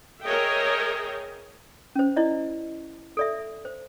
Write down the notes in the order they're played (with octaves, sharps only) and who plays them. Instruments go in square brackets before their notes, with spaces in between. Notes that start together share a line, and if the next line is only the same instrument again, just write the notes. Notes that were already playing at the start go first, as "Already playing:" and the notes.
[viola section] G#4 A#4 C#5 D#5 E5 G5
[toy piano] C#4 C5
E4 D5 D#5
A4 D5 E5
C5